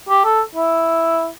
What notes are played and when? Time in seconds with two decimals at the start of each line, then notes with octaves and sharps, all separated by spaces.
0.09 G4
0.25 A4
0.55 E4